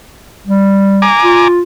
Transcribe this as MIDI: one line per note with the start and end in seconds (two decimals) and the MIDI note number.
0.47 1.10 55
1.02 1.48 80
1.02 1.48 82
1.02 1.48 86
1.24 1.62 65